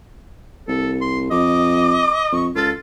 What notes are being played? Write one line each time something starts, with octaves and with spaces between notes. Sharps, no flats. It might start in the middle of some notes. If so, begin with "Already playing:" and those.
C2 A4
C6
F2 D#5 D6
F2 C#6
C#2 F4 A4